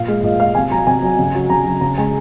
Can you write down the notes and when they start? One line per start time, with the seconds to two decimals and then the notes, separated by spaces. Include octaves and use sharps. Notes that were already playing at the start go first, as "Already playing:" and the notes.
Already playing: A#2 F5
0.08 G#3
0.23 A#2 D#5
0.39 G#3 F5
0.55 C3 G#5
0.71 F#3 A#5
0.87 C3 G#5
1.03 F#3
1.19 C#3
1.35 F#3
1.50 C#3 A#5
1.66 F#3
1.81 C#3 A#5
1.98 G#3 G#5